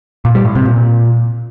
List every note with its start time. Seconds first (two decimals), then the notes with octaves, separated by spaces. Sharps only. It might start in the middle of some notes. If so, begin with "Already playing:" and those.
0.25 A#2
0.35 G3
0.45 A2
0.55 C3
0.66 A#2